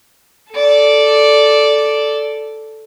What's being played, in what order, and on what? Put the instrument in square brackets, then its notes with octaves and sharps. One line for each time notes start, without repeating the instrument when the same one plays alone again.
[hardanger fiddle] A4 D5